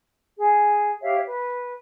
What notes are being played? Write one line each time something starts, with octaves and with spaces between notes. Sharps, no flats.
G#4
G4 C#5 E5 F5
B4